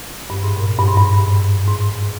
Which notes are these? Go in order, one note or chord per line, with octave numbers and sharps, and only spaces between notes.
G2
G#2
A#2
G2
G#2
G2
G#2